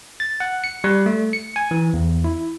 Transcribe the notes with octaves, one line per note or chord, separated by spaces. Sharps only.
A6
F#5
C#7
G3
A3
C#7
G#5
E3
E2
E4